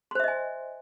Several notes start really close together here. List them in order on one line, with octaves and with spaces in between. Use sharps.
C6 C5 E5 D#5 G#5